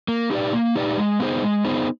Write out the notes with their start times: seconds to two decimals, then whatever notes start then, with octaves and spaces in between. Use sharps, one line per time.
0.08 A#3
0.31 D#4 G4 B4 D5
0.53 A#3
0.76 D#4 G4 B4 D5
0.97 G#3
1.20 B3 D#4 G#4 C5
1.43 G#3
1.65 B3 D#4 G#4 C5